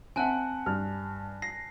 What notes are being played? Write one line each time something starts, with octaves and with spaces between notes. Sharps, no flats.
C4 E5 F#5 G#5 A5 F#6
G2 F6
A#6 C7